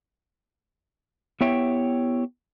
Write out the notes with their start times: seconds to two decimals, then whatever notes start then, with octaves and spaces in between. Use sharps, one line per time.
1.41 B3 E4 G4 C#5 E5 G5